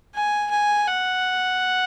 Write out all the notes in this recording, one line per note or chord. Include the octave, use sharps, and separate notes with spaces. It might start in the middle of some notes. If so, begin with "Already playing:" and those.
G#5
G#5
F#5